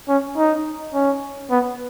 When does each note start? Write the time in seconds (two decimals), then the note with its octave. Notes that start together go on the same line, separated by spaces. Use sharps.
0.08 C#4
0.37 D#4
0.94 C#4
1.50 B3